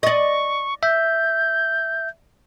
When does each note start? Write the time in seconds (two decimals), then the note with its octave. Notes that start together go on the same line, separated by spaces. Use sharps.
0.03 D5 D#5 C#6
0.83 E5 G6